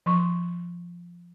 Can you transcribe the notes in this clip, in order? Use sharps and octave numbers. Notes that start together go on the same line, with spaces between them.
F3 C6 C#6